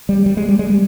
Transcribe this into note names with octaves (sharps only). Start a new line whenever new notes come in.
G3
G3
G#3
G3
G#3
G3